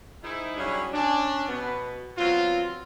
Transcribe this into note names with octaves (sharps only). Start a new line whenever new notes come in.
G#2 D#4 E4
F#3 G3 C#4 D4 E4 G#4
C#4 D4
B2 B3
F#3 B3 C4 F4